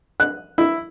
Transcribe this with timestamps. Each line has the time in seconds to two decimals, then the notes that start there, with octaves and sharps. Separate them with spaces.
0.20 F#6
0.58 E4